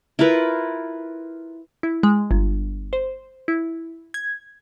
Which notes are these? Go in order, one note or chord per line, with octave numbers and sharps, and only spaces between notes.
E4 F4 A#4 B4
E4
G#3
G1
C5
E4
G#6